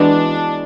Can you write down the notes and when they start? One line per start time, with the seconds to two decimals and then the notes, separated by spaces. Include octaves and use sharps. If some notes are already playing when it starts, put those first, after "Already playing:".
Already playing: E3 G#3 B3 D4 F#4